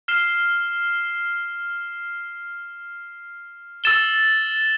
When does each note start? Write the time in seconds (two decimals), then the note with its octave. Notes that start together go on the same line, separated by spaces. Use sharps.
0.08 F6 C7 E7 G7
3.84 E6 A6 E7 G7